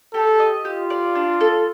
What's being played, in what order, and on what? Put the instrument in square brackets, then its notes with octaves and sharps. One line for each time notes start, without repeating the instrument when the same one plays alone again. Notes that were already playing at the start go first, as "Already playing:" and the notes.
[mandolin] G4 [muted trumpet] A4
[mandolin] D#5
[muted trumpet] F4 [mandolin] G4
[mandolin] D5
D4
A4